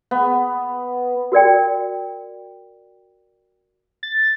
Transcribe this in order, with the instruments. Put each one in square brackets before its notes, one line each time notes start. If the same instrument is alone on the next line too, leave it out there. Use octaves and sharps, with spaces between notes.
[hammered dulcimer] B3
[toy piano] F#4 A#4 D5 G5
[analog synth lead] A6